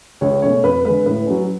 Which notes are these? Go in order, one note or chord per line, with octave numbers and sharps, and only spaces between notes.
C#2 C#5
B2 A3 C#4 C#5
F2 B4
D3 G#3 B4
A2 B4
F#3 C#4